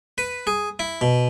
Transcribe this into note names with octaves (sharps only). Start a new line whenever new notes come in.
B4
G#4
E4
B2